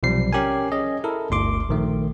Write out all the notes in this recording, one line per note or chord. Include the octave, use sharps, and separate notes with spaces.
B1 C3 F3 G3 C7
C#4 G4 A#4 G#5
C#4 G#4 D#5
E4 A4 A#4
G1 D2 C6 D6
A#1 D#3 A3